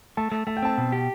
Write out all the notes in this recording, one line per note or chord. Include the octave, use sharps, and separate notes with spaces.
A3 A5
A3
A3 A5
G5
C4 A5
B2
G4